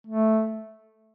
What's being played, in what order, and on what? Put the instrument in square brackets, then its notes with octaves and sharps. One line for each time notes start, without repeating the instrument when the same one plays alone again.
[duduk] A3